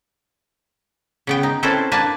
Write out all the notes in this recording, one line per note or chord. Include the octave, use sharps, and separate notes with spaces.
C#3 B3 G5
D#4
C4 C#4 E4 A4 B4 C5
A#3 D4 B4 G#5 A5